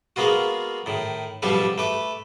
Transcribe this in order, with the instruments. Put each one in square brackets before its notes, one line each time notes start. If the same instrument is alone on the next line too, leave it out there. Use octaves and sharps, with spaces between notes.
[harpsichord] G#3 A#3 B3 F4 F#4
A2 D#3
A1 B2 F3 G3 D4 A4
A3 B4 D6